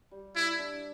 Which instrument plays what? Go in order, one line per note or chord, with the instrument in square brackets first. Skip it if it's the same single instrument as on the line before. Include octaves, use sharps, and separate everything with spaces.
[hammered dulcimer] G3
[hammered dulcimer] G3 [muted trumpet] E4
[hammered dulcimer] D4